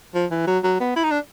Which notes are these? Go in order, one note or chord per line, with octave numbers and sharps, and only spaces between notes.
F3
E3
F#3
F#3
B3
E4
D#4
D4